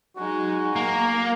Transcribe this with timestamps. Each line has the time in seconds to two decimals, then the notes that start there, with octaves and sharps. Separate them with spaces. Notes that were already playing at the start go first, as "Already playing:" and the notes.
0.16 F#3 G#3 D#4 F#4
0.76 A#3 A#5